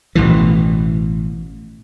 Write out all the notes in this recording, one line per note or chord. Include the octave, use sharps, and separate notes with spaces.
A1 B2 E3